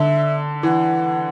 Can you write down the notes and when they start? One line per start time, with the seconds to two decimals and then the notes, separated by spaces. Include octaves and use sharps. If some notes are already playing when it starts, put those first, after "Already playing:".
Already playing: D3 E5
0.63 E3 F#5